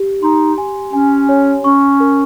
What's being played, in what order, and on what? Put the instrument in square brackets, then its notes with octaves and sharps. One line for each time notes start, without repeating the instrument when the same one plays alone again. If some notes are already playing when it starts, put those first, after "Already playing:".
Already playing: [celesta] G4
[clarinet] D#4 [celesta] C6
[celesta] G#5
[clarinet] C#4 [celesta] G#5
[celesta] C#5
[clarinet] C#4 [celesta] C#6
[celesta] A#4